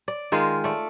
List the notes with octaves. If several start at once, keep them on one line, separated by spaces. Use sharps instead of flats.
D5
D#3 G#3 F4
A3 D5